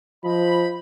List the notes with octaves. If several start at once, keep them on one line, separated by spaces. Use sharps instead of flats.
F3 C5 D#5 B5